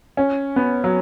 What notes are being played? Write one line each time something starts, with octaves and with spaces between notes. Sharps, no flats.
C#4
B3
F#3